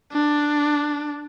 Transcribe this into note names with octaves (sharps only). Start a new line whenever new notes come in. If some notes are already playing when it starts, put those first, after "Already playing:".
D4